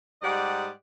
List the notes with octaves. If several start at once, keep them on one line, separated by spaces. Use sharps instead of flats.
G#2 G3 G4 D5 D#5 F#5